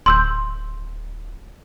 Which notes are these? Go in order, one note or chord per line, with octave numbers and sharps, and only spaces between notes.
D1 C6 E6 G6